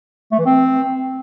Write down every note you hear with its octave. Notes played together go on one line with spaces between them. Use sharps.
A3
E3
C4